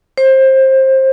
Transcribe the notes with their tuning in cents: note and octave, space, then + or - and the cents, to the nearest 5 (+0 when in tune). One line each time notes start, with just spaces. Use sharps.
C5 +20